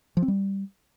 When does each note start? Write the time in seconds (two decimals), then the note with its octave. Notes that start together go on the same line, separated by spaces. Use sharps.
0.17 F3
0.22 C4
0.28 G3